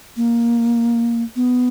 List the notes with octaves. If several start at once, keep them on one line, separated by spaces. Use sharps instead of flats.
A#3
B3